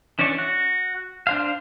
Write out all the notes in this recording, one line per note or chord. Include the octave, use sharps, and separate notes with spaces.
E3 C#4 D4 D5 C#6
F#4
D4 C5 F5